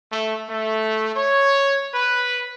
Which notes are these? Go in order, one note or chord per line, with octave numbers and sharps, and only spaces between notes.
A3
A3
C#5
B4